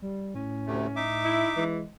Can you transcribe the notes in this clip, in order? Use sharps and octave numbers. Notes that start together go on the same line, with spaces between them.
G3
A2 C#4
D2 C3 A3
D#4 E5 D6
E4
E3 G#3